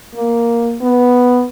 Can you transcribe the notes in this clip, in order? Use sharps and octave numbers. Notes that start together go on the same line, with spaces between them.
A#3
B3